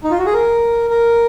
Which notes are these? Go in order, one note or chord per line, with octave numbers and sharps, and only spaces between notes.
D#4
F4
F#4
G#4
A#4
A#4